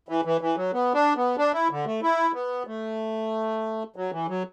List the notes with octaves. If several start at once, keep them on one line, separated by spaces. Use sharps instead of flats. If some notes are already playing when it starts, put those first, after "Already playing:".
E3
E3
E3
F#3
B3
D4
B3
D4
E4
D3
A3
E4
B3
A3
F#3
E3
F#3